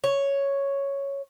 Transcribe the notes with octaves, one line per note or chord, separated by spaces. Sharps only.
C#5